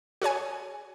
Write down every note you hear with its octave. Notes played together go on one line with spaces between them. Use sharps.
F#4 G#4 C#5 G#5